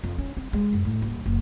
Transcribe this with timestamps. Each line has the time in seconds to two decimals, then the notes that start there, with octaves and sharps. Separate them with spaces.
0.04 F2
0.18 C#4
0.37 C4
0.53 G#3
0.73 F#2
0.85 A2
1.02 D#1
1.26 F#1